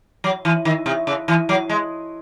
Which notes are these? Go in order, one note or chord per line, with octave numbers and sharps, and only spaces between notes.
F#3
E3
D#3
C3
C#3
E3
F#3
G#3